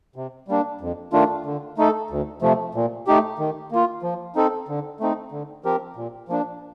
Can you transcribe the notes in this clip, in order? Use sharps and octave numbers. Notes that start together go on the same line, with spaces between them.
C3
G3 A#3 D4
F2
D#3 A3 D4 F4
D3
A3 D#4 A4
D2
C3 F3 A3
A#2
A3 D#4 G4
D#3
A#3 F4
F3
C4 D#4 A4
D3
A3 C4 D#4
D3
F3 C4 G4 A#4
A#2
F3 A#3 D4